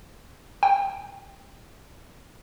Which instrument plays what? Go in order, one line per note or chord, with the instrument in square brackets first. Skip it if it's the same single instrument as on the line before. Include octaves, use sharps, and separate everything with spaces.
[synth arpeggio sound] G5